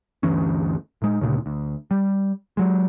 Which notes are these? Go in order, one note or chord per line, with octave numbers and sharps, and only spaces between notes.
D2 G2 E3 C#4
A2 G#3
D2 A#2 C#3
D2
G3
F#3 G#3